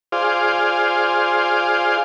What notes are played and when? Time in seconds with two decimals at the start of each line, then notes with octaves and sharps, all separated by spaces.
0.12 F4 G#4 C5 D5 F5